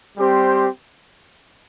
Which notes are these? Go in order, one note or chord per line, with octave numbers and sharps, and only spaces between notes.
G3 C4 G4 C5